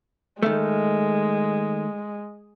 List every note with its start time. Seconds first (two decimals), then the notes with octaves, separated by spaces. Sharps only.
0.43 D#3 G#3 A3